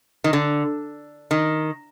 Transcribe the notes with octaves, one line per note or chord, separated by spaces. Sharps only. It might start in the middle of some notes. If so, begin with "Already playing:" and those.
D#3
D3
D#3